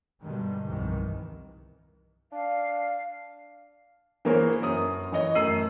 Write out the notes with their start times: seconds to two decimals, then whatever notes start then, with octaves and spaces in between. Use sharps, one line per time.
0.21 G2 B2 D3 D#3 G3 G#3
0.67 C2 F2 C3 D#3 E3
2.32 D4 F5
4.25 E3 A#3 G#4 A#4 C5 C#5
4.62 F#2 C#5 D#6
5.12 E3 C#5 D#5
5.35 F#2 A3 E6 C7 D#7